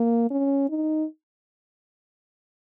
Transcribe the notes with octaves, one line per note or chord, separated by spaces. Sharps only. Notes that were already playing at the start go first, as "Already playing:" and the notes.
Already playing: A#3
C#4
D#4